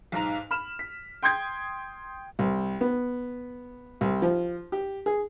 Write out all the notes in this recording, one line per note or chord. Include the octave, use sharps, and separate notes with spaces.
B1 G#2 A#5 F7
B5 F6 E7
B6
G5 C6 D#6 G6 G#6
C2
B3
C2
F3
G4
G#4